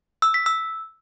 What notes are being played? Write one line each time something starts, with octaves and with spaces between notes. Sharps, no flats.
E6
B6
E6